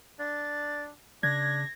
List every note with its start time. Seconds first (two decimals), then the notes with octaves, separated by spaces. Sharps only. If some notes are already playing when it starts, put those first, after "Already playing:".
0.19 D4 A6
1.23 C#3 D4 G#6 A#6